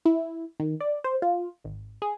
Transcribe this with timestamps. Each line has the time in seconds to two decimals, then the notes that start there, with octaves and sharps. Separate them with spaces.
0.05 E4
0.60 D#3
0.81 D5
1.04 C5
1.22 F4
1.64 G#1
2.02 G#4